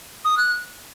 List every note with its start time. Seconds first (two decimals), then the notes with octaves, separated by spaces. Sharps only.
0.25 D#6
0.37 F#6